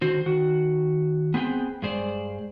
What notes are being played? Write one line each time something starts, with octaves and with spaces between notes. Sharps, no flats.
D3 D#3 F#4 C5
D#3 F#4
B3 C4 G#4 G5
G2 G#3 G#4 C5 D5